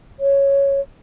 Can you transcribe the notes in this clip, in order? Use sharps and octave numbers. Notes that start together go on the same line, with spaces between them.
C#5